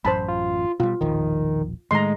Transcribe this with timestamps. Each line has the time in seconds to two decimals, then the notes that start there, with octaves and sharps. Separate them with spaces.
0.05 A1 F#2 C5 A5 B5
0.28 F4
0.80 B2 G3 F4
1.01 E1 A#1 D#3 F3
1.91 A2 D#3 G#3 A3 A#5 C6